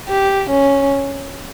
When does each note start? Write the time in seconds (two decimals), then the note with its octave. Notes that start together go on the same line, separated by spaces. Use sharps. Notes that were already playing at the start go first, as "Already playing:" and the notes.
0.09 G4
0.50 C#4